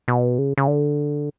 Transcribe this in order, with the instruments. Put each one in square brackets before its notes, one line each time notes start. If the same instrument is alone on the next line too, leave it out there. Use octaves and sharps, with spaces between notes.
[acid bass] B2
C#3
C#3
D3